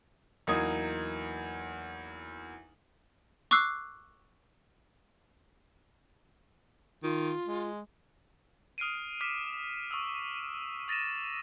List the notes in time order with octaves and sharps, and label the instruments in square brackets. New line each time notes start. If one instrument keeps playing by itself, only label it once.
[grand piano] E2 F#3 A#3 D#4 D#6 G#6
[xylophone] C#6 D6 E6 F#6 C7
[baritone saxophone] D#3 [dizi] F4
[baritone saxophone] G#3
[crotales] D#6 F6 C7 D7 D#7
D6 F6 B6 E7
C#6 D#6 E6
D#6 A6 A#6 D#7 E7